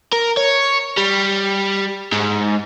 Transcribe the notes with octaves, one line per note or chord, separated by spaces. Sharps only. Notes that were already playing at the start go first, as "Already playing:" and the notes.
A#4
C#5
G3
G#2